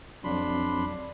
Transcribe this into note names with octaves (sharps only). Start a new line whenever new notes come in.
F2 F#3 D4 B5 C6